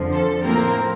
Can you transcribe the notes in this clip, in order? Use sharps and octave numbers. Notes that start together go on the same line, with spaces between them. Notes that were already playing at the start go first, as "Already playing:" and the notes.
Already playing: F2 D3 F3
A4
A2 F3 A#3 C4 A#4